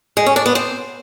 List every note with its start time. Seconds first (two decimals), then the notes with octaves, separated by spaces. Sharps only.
0.17 G#3
0.26 C#4
0.36 D4
0.46 B3
0.55 C4